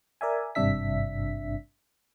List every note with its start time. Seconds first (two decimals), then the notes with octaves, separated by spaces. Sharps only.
0.21 A#4 D5 E5 G#5
0.55 G#1 G2 C3 D4 E5 B6